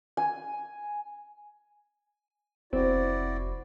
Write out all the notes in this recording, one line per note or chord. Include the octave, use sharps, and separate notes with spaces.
G#5
F1 C4 E4 F#4 D5